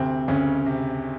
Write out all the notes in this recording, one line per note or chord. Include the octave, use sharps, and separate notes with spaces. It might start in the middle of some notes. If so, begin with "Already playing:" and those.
Already playing: D2 C3 C4
D2 C#3 C#4
C3